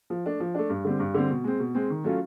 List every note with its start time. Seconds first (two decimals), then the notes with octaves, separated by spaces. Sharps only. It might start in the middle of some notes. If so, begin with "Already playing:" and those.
0.10 F3
0.25 A3 D4
0.40 F3
0.55 A3 D4
0.70 G2
0.85 D3 G3 C4
1.00 G2
1.14 D3 G3 C4
1.30 B2
1.44 G#3 C4
1.60 B2
1.74 G#3 C4
1.90 D#3
2.04 F#3 A3 C#4 F4